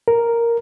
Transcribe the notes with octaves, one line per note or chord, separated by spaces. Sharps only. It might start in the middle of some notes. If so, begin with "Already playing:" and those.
A#4